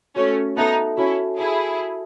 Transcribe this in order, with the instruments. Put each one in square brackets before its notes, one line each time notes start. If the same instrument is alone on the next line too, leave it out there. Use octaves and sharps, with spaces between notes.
[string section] A3 C#4 [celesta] F#4
[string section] B3 D#4 [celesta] A4 E5 A5
[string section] C#4 E4 [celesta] F#4
[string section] E4 G#4 [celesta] A4 E5 A5
[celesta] F#4